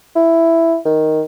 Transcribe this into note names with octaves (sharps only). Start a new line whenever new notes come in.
E4
D#3